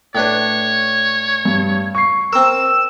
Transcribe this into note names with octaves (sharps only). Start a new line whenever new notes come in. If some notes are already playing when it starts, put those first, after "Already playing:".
A2 D4 B4 C#5
G2
C#6 C7
C4 A#4 E6